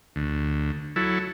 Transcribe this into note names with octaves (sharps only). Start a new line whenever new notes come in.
D2
F#3 E4 A4